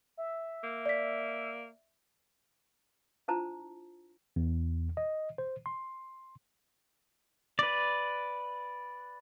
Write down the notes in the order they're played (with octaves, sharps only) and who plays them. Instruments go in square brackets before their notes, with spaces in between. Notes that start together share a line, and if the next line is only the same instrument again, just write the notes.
[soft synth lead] E5
[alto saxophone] A#3
[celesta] D5 B6
[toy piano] D4 E4 F4 C5 A5 A#5
[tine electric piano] E2
D#5
C5
C6
[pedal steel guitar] B4 D5